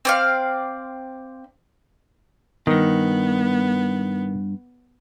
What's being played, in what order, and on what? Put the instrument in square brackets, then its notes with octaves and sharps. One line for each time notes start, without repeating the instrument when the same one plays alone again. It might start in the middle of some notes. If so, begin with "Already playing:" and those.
[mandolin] C4 D5 F5
[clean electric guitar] E2 G2 [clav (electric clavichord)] D#3 [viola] B3